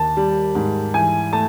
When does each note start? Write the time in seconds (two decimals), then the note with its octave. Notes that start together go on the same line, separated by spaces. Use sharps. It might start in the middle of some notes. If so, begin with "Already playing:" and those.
Already playing: D#2 A5
0.17 G3
0.55 G#2
0.94 E3 G#5
1.33 A3 A5